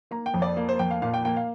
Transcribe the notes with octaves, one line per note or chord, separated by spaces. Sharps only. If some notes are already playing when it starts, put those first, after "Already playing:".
A#3 A#5
G5
F2
D5
A#3
C5
F2 G5
F5
A#2 F5
G5
A#3 G5
F5